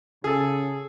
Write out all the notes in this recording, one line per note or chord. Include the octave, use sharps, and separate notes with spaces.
C#3 G#4 A4